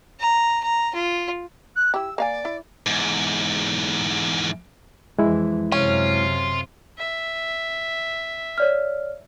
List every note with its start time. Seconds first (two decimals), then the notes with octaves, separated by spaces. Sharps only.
0.20 A#5
0.63 A#5
0.94 F4
1.75 F#6
1.94 E4 G4 E6
2.18 A#3 D5 F5 G#5
2.45 E4
2.86 E2 G#2
5.19 F2 E3 G#3 E4
5.72 F#2 C3 C#4 F4
6.98 E5
8.58 C#5 D5 F6